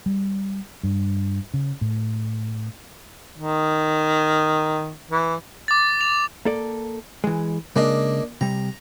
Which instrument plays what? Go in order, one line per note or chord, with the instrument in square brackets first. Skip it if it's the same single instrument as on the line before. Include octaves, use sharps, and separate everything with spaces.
[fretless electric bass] G3
G2
C#3
A2
[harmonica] D#3
E3
[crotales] D6 A6
F7
[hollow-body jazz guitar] A#3 A4 D5
E3 G#3
[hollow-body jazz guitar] C#3 G#3 [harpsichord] A#3 D4 D#5
[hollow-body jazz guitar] C3 G3 [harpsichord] A#5